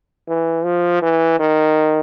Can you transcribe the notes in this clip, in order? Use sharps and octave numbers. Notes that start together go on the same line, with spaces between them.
E3
F3
E3
D#3